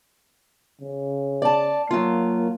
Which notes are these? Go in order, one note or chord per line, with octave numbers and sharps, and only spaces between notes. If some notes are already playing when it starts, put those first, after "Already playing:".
C#3
D5 A5
F#3 A#3 F4